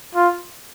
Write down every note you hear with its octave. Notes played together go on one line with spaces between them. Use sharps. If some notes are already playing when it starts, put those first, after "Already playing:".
F4